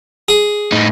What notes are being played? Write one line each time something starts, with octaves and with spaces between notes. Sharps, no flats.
G#4
A2 D#4